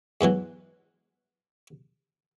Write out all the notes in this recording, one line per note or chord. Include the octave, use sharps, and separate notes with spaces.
G#2 B2 E3 F#3